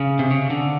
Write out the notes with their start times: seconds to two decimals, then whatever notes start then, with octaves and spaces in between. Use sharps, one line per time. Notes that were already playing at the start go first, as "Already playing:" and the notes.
Already playing: C#3
0.19 C3
0.31 C#3
0.50 D3